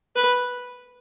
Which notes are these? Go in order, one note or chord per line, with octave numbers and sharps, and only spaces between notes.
B4